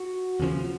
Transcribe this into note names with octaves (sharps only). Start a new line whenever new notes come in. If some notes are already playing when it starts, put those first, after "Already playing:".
Already playing: F#4
D#2 C#3 F3